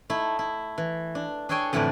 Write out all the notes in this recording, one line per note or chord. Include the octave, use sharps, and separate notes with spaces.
A3 D#4 E4
E4
E3
D4
D4 G#4 A4 C#5 G5 G#5
F2 A2 D3 E3 B4 D5